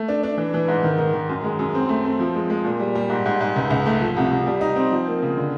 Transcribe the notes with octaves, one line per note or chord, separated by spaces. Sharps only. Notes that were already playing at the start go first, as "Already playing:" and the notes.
Already playing: A3
D4
D4
E3
E3
G#2
D#3
D#3
D#3
F#2
G#3
F#2
C4
A3
C4
F3
G#3
G#3
A#2
G3
G3
G#2
G#2
G#2
C#2
C#2
A3
F3
C2
C2
G3
D#4
C4
F3
A#3
C#3
D3